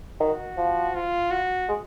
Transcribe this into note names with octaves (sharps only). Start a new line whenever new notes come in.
D#3 F#4
F3
F4
F#4
G#3